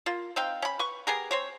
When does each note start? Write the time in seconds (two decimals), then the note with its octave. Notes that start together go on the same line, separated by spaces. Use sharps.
0.06 A#3 F4
0.36 C4 D#4 F5 G5
0.62 C#4 B5
0.79 B4 C#6
1.07 B3 G4 G#4 A#4
1.31 C4 C5 C#5